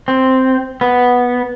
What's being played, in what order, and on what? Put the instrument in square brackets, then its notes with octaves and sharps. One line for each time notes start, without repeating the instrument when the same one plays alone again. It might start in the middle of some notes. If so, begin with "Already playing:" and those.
[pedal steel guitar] C4
B3